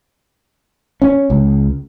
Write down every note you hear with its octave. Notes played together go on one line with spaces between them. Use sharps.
C#4
C#2